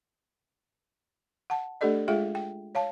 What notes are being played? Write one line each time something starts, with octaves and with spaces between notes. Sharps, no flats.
F#5 A5
A3 D4 G4 A4 D5 D#5
G#3 F4 G#4 E5 G5
G5
C#5 F5 A5